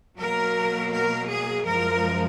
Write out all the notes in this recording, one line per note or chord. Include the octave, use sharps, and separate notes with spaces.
B2 F#3 A#3 A#4
A#4
G#4
F#2 F3 G#3 A#4